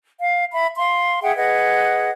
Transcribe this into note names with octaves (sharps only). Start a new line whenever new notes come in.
F5
E5 B5
F5 C6
G#4 E5 F#5 G5
G#4 B4 D#5 F#5